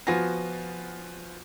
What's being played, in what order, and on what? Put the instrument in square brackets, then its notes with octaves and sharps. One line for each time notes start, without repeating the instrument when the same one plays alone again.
[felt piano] F3 B3 F4 F#4 G#5 A#6